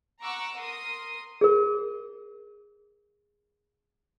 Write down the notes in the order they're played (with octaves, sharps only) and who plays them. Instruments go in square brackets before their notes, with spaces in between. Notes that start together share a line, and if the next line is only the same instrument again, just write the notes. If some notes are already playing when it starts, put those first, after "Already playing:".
[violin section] F#5 A#5 C#6 D6 E6
A#4 C6 D#6
[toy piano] G#4 A#4